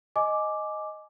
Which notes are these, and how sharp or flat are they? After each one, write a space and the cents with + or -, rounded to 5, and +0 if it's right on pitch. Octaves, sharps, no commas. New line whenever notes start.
D#5 +0 G#5 +20 D6 +0